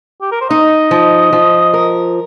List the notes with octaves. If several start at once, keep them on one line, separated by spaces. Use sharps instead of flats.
G4
A#4
C5
D#4 D#5
F3
F3
A#4